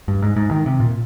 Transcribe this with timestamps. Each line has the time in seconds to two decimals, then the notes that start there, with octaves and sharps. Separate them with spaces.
0.08 G2
0.22 G#2
0.36 G#2
0.51 D#3
0.66 C3
0.80 A#2